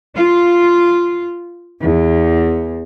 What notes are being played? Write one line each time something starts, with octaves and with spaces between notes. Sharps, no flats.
F4
E2